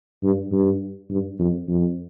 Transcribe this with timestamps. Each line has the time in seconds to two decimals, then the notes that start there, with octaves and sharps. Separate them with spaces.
0.23 G2
0.52 G2
1.10 G2
1.39 F2
1.68 F2